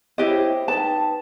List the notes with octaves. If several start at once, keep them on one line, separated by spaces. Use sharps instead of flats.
E4 G4 C5 C#5 D#5 G5
D#4 B4 G5 A5